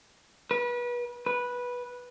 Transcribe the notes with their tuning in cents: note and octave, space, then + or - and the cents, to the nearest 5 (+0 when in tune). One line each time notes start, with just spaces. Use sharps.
B4 -30
B4 -10